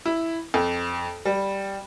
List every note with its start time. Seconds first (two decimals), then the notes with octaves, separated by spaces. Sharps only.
0.06 E4
0.54 F2
1.25 G3